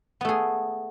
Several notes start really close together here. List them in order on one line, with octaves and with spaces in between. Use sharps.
B3 A3 G#4